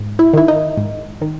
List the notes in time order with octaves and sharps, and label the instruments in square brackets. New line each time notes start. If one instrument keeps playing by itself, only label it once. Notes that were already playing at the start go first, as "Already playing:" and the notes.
Already playing: [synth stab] G#2
E4
D#3 E4
D#4
G#2
D#3